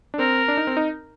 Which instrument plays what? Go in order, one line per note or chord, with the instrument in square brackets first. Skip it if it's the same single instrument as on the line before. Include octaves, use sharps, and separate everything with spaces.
[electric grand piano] D4
[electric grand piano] C4 [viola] A#4
[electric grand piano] D4
D#4
C4
D#4